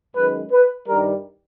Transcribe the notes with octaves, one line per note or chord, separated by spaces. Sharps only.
F#2 D#3 G#3 B4
B4
G2 D#3 G3 A#4